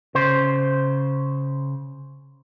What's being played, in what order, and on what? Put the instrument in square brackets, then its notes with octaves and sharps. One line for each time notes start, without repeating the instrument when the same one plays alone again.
[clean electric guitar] C#3 C5